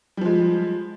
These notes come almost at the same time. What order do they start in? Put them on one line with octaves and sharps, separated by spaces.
G3 F3 G#3